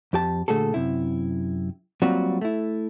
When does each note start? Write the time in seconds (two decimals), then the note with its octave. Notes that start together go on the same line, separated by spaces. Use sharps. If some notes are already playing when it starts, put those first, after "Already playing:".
0.13 F2 G4 A5
0.48 A#2 D3 A3 F#4 G#4 A4
0.74 F#2 C3 E4
2.02 F#3 G3 A#3 C4 F4 F#4
2.41 A3 E4